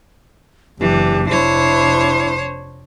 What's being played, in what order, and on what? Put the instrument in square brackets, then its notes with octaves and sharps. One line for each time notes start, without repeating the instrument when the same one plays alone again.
[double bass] F#1 D4 [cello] E3 [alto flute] G4
[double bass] F1 D4 [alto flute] E4 [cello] C5 C#5